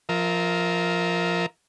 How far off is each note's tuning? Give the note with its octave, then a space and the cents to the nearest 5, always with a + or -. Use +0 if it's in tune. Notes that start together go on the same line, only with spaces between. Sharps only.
F3 +0 A#4 +0 E5 -35